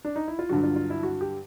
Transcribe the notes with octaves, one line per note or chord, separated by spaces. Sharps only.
D4
D#4
E4
F4
G2 D3 F#3 F#4
F4
F4
E4
F#4
G4